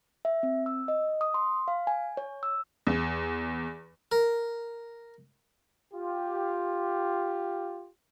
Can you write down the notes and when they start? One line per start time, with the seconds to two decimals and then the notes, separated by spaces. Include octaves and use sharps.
0.25 E5
0.43 C4
0.66 E6
0.88 D#5
1.21 D#6
1.34 C6
1.68 F5
1.87 G#5
2.17 C#5
2.43 E6
2.87 E2
4.12 A#4
5.94 F4 G4